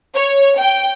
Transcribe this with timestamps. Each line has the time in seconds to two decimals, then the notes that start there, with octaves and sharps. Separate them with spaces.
0.14 C#5
0.58 G5